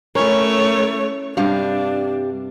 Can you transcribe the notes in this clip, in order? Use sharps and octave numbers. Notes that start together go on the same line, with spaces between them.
A3 C#4 E4 A#4 C#5
G2 C3 G3 D4 F5